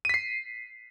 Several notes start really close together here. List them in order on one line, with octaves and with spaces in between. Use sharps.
D#7 B6 C7